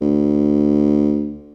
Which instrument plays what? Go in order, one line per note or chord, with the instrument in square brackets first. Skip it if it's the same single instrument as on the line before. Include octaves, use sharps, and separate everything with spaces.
[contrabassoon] D2